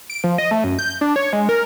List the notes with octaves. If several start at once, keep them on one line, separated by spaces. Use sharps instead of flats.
D7
F3
D#5
A3
F#2
G6
D4
C#5
G#3
A#4